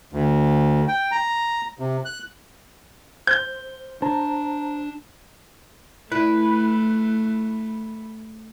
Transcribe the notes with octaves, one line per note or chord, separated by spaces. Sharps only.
D2
G5
A#5
C3
F#6
C5 G6
D4 C5 A5 A#5
A3 E4 B4